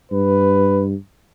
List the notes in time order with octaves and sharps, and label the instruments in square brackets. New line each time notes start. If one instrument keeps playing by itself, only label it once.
[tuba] G2 [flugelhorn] B4